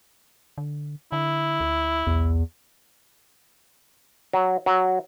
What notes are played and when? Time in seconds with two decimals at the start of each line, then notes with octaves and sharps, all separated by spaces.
0.58 D3
1.12 D3 E4
1.60 D2
2.07 B1 E2
4.33 F#3
4.66 F#3